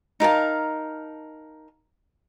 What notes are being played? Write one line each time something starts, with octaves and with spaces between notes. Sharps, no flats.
D#4 A#4 F5 A5